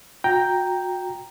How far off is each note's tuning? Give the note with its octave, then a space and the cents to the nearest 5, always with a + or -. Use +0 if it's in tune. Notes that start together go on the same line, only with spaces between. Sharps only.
F#4 -35 G5 +0 A#5 +0